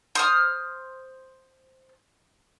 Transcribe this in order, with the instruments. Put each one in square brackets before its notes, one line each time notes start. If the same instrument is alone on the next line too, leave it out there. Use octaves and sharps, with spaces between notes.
[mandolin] C5 D#6 F6